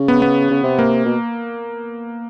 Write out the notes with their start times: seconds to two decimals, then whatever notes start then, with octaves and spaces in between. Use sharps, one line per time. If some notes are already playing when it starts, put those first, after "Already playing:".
Already playing: C#3
0.08 B3
0.22 B3
0.51 C#3
0.63 C3
0.79 A#3
1.06 B2